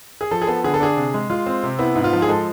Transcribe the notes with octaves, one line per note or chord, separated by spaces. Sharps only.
G#4
F3 A4
G#4
B3 A4
D3 G#4
A4
D4 G#4
C3
G#3
G#3 F4
C4
C3
B3 E4
G#2
F4
F3
G#4
G#3 A4